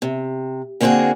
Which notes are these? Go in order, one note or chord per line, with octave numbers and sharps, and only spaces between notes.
C3
D3 A#3 C4 D4 F#4 G#4